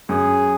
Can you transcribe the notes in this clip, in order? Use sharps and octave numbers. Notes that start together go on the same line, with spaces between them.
F#2 G#4